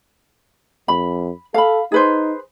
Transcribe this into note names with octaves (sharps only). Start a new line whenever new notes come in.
F2 B5
A4 F5 B5
D#4 G#4 B4 C5